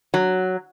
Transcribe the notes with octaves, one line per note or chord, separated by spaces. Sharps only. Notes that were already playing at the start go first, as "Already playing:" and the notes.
F#3